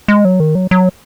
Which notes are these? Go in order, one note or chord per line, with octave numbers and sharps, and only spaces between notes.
G#3
F#3
D#3
F#3
F#3